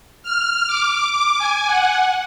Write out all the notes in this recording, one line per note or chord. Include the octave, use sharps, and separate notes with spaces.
F6
D6
D6
G#5
F#5